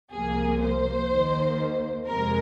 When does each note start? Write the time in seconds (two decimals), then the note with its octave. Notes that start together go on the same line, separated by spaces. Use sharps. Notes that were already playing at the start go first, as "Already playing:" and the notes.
0.12 C2 C3 F3 A#3 G#4
0.60 C5
1.09 D#2 D#3 A#3
2.07 F2 C3 G#3 A#4